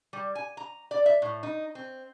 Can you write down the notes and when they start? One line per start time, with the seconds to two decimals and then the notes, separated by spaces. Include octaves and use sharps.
0.13 G3
0.35 G#5
0.57 A#5
0.91 D5
1.06 E5
1.22 A2
1.43 D#4
1.75 C4